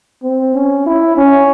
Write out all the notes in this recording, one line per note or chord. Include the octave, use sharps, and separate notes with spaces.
C4
C#4
E4
C#4